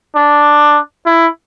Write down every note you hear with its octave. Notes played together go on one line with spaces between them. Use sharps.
D4
E4